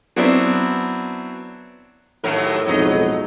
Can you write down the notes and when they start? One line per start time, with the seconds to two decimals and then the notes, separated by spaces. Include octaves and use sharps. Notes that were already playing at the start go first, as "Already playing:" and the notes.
0.16 F#3 B3 C4 D4 E4
2.24 D#2 A2 F#3 A#4
2.67 B1 F2 G#2 F#3 D#4 D#5